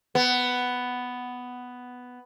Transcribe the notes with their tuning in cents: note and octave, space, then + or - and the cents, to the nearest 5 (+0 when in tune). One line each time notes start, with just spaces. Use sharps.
B3 +5